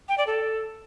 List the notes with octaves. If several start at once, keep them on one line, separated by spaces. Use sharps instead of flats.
G5
D5
A4